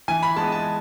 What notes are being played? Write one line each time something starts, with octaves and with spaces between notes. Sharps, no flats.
E3 G#5
B5
G#3 B3 A5
A5